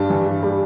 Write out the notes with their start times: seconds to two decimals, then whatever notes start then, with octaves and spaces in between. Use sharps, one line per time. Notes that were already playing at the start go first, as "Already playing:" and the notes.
Already playing: G2 G3 A5
0.10 E3
0.26 G2
0.43 G3